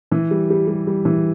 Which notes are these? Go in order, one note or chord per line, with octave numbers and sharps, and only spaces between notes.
E3
G3
G3
G3
G3
E3